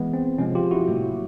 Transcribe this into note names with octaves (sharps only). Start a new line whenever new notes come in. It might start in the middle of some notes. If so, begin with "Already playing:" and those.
Already playing: E3 G#3 B3
C4
C3 F3 G#3 C#4
F4 G4
E4 F#4
A2 F#3 A#3